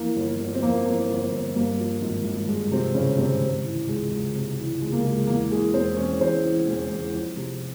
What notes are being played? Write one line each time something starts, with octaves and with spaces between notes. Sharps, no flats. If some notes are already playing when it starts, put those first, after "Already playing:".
Already playing: F2 E3 A#3
G1
G1
C4
F2 A#3
E3 A#3
G1
G1
G2 A#3
F3
G#1
G#1
G2 G#3
C3 F3 C4
G#1 C#3 C#4
G#1 C3 C4
C3
E3
C#2 G#3
C#2
C3
E3
C#2 G#3
A#3
C#2 G#3
G#3
E2 A#3
E3 G#3 G#4
E1 C4 C5
E1 C#4 C#5
E2 C4 C5
E3
E1
E1
F2
C3